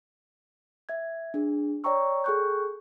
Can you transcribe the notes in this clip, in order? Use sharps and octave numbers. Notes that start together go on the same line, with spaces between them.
E5 G#6
D4 G#4
C#5 D5 G5 A#5 C#6 E6
G#4 A4 G5 C#6 F#6 G6